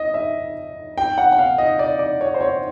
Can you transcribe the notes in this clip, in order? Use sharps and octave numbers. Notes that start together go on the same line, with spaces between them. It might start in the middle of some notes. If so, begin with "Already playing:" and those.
Already playing: D#5
E5
G5
F#5
F#5
F5
D#5
D5
D5
C#5
C5
C#5